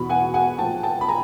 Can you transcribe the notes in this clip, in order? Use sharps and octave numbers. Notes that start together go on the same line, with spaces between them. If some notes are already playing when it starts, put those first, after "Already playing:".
Already playing: E2 B2 B5
F#5 G#5
F#5 G#5
A#2 F3 G5 A5
G5 A5
B5
G#5 A#5